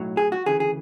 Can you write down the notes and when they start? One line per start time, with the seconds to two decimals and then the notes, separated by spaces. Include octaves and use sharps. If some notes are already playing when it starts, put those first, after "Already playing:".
Already playing: B1 A2 F#3
0.17 G#4
0.32 F#4
0.46 D2 C#3 E3 G#4
0.60 G#4